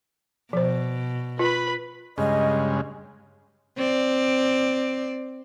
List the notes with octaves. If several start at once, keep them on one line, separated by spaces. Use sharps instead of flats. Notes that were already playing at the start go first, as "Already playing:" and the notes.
B2 F3 C5
F4 B4 B5
G2 C#3 G#3 D#5
C4 D5